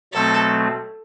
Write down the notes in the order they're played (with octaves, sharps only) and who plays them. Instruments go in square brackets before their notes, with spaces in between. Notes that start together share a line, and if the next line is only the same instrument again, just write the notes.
[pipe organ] B2 F#3 A3 C4 [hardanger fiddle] A4